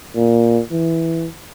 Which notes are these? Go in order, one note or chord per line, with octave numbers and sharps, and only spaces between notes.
A#2
E3